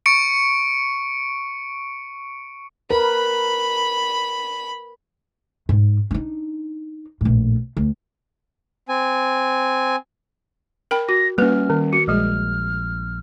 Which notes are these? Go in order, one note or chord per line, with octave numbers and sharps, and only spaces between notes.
C#6 C#7 D7
A#4 B4 B5
G#2
D4 D#4
A#1 A2
D2
C4 G#5
A#4 G5 B5
F#4 A#6
G3 A#3 C#4 B4 F6
D#3
F#4 C#7
A#1 G3 G#3 G#4 F6